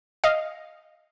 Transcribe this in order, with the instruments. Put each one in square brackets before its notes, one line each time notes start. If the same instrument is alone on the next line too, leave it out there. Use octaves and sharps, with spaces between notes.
[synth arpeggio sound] D#5 F5